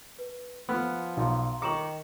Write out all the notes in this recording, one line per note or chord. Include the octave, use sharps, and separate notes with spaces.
B4
F3 B3 B5 F6 F#6
B1 F5 A#5 C6
D#3 A#5 C#6 D6 C#7 E7 F#7